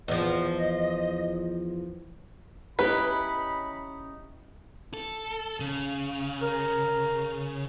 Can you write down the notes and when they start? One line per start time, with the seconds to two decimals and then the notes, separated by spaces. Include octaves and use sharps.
0.08 E2 F3 D#5
2.79 C#4 D#4 E4 G4 B4 B5
4.94 A4
5.60 C#3
6.42 A#4